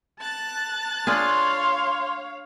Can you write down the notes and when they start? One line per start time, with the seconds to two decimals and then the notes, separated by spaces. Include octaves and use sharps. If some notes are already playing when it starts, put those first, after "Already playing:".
0.19 A5 F#6 A6
1.07 D4 F4 G#4 C#5 F5 C6